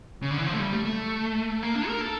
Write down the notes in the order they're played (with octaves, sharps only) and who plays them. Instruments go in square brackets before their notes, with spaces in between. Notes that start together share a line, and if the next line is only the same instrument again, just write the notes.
[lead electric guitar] C#3
D3
E3
F3
A3
G3
A3
A3
A#3
D4
A#4
A4